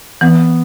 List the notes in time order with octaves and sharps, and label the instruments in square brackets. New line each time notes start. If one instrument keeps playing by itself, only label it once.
[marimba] E3 [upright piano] B3